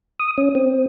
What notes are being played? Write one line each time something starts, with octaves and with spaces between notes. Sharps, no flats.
D#6
C#4
C4